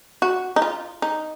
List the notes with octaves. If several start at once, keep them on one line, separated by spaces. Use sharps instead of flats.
F#4
D#4
F4
D#4